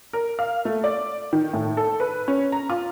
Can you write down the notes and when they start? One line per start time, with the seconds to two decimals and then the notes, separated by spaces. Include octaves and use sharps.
0.13 A#4
0.39 F5
0.65 A3
0.84 D5
1.33 D#3
1.53 A2
1.77 A4
2.00 B4
2.28 C#4
2.52 A#5
2.70 F4